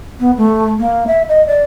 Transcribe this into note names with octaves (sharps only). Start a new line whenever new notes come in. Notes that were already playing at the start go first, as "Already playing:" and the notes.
B3
A3
A#3
E5
D#5
D5